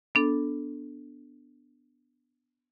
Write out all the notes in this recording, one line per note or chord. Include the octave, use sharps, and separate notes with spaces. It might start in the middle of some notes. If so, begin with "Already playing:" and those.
B3 D4 A4